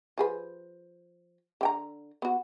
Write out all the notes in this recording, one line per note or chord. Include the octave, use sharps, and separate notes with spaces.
F3 G#4 B4
D3 G5 A#5
B3 F#4